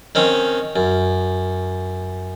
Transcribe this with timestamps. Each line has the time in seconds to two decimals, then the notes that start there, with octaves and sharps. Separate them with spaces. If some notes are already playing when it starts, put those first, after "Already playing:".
0.15 D#3 C4 C#4
0.76 F#2